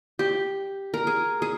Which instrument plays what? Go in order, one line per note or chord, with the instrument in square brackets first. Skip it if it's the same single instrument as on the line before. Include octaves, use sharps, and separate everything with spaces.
[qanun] G4
A#4
G#4
G#4